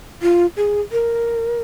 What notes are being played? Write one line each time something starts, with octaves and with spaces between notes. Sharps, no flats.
F4
G#4
A#4